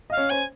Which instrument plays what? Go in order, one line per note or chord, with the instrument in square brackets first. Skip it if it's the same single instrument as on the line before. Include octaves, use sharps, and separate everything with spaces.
[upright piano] D#5 [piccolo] F5
[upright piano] C#4 C#5
[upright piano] C5 [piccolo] G#5